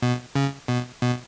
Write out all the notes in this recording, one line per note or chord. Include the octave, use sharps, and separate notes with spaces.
B2
C#3
B2
B2